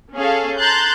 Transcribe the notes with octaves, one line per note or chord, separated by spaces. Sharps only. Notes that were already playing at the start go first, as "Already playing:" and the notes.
C#4 G#4 A4 F5
A5 A#5 C6 F#6 G6 A6